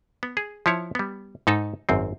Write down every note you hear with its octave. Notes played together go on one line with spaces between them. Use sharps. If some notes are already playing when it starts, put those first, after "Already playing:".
B3
G#4
F3 E4 C#5
G3 B3
G#2 D#4 A4
G#1 F#2 C4